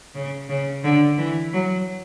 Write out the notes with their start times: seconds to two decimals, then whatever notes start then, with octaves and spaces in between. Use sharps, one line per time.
0.15 C#3
0.49 C#3
0.84 D3
1.18 E3
1.53 F#3